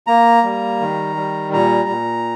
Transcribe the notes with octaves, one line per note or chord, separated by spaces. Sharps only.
A#3 A#5
G3
D#3
G3
A#2 A#5
A#2